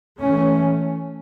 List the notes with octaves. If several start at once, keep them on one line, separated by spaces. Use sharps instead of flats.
E3 A3 C#4